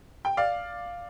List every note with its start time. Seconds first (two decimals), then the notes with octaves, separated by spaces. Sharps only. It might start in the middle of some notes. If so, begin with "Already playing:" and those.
0.25 G5
0.37 D5 F5